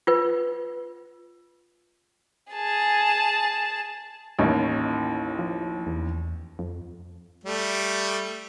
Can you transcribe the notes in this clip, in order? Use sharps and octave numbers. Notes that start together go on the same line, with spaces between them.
F4 B4
G#4 A5
A1 D#2
F3
E2
F2
G3 A3